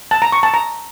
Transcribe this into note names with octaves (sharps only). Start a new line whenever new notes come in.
A5
A#5
C#6
A5
A#5